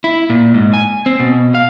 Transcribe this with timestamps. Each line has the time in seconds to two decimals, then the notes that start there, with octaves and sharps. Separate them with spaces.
0.04 E4
0.30 A#2
0.54 G#2
0.74 G#5
1.06 C4
1.20 B2
1.55 F5